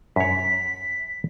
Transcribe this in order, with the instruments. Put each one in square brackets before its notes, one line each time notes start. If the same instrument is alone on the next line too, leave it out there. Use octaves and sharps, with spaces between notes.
[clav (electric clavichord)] F#2 C#5 [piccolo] B6